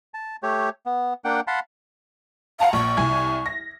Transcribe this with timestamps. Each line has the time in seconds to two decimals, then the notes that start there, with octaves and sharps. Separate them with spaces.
0.14 A5
0.43 A3 G4 C#5
0.86 B3
1.25 A#3 D4 F#5 G5
1.47 F5 F#5 A5 B5 C6
2.60 F5 F#5 A5 A#5
2.73 A#1 C#6
2.97 C2 G#5 G#6
3.46 A#6